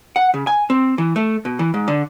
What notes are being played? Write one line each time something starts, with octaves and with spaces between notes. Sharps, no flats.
F#5
C#3
G#5
C4
E3
A3
B2
E3
G#2
D3